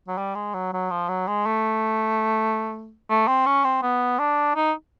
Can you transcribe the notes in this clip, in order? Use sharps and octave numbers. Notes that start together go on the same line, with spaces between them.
F#3
G3
G#3
F#3
F#3
F3
F#3
G#3
A3
A3
C4
C#4
C4
B3
D4
D#4